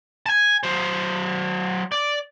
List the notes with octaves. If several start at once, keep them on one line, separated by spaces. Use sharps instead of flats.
G#5 A5
F#3 C5
D5